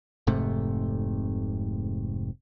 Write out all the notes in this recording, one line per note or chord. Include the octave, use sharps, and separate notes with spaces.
F1 G#2 C3 A3